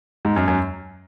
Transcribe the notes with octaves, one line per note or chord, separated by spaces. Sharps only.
G#2
F#2
F#2